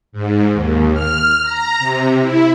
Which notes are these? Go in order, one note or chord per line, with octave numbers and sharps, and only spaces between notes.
G#2
D#2
F6
A#5
C3
E4